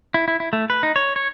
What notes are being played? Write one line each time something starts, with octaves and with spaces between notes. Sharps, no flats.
E4
E4
E4
A3
B4
D#4
C#5
C#5